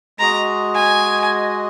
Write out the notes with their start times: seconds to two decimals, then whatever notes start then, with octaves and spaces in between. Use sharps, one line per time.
0.19 G#3 F#4 D#5 A#5
0.75 G#5